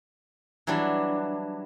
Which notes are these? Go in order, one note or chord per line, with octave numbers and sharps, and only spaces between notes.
E3 F#3 G3 D4